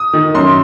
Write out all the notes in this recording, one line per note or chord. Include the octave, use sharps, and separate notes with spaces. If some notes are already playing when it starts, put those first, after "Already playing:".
Already playing: D#6
D#3
F#2 C6